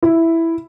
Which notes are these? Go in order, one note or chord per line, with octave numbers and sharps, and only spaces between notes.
E4